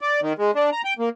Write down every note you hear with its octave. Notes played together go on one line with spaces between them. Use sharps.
D5
D#3
G#3
D4
A#5
G5
A#3